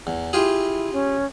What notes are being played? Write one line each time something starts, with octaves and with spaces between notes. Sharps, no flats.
E2
E4 F4 G4 G#4
C#4